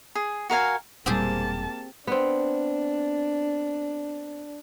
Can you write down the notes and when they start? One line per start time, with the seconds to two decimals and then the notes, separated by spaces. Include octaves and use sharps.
0.15 G#4
0.50 F#4 A#4 F5 G#5
1.06 E1 A#2 G3 A#3 C4 G4 G#4 A5
2.07 B3 C4 D4